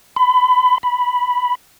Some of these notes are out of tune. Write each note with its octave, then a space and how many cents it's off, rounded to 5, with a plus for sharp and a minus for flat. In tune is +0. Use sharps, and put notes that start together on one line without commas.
B5 +30
B5 +0